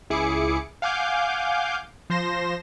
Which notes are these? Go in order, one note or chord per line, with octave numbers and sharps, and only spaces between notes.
C#2 E4 G#4 D6 C#7
F5 F#5 G#5 D6 G6
F3 C5 C6 A#6 E7